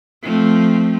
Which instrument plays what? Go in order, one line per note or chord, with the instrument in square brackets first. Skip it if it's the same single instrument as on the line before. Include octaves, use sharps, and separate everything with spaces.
[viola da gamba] F3 A3 C4